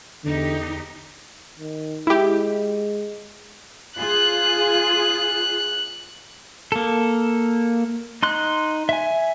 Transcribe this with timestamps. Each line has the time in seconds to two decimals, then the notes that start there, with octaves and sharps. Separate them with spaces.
0.24 E2 D3 D#4 G4
1.59 D#3
2.07 G#3 E4 G4
3.98 F4 G#4 F#6
6.72 A#3 A4
8.23 D#4 C6 F#6
8.89 E5 G#5